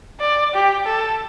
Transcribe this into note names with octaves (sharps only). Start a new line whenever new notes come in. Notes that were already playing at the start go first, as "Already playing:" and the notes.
D5
G4
A4